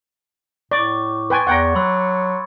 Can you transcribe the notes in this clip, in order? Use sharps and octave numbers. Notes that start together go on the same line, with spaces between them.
A2 D5 C#6 D6
B4 G5 G#5 C6 C#6 A6
E2 F#5 G5 A#5 C#6 G#6 C#7
F#3 B5 C6 E6